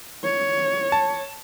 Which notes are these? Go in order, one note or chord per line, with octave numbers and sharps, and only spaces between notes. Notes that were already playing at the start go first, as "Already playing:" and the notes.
C#5
A5